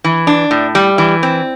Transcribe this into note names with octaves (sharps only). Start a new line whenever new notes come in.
E3
D4
A2
G3
E3
C4